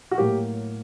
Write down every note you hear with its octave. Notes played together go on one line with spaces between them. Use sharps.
F#4
A2 F#3 A#3 G4